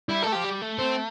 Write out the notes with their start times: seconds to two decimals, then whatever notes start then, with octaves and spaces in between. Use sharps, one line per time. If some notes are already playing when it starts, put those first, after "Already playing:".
0.09 G3 E4
0.23 A3 A4
0.32 F3 G4
0.44 G3
0.62 A3
0.79 C4